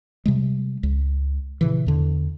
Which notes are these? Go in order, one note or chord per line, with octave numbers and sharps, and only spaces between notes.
C3 G3 G#3
C#2
A#2 C#3 E3
E2 D3